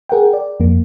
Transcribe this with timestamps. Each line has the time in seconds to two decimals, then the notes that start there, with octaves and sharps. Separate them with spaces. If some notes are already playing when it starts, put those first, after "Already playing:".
0.09 G#4 A#4 F#5 G5
0.33 D5
0.60 F2 A#3